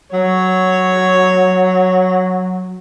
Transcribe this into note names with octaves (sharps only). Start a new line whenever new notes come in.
F#3 C#5